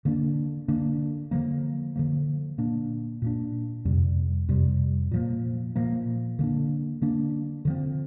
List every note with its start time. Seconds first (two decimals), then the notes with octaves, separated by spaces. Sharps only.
0.05 D3 A#3 D4
0.68 D3 A#3 D4
1.31 D3 F3 A#3
1.96 D3 F3 A#3
2.58 A#2 A#3 D4
3.22 A#2 A#3 D4
3.85 F2 C3 G3
4.48 F2 C3 G3
5.11 A#2 F3 A#3
5.76 A#2 F3 A#3
6.39 D3 A#3 D4
7.02 D3 A#3 D4
7.65 D3 F3 C4